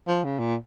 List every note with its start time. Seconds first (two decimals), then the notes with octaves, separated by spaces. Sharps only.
0.07 F3
0.24 C#3
0.39 A#2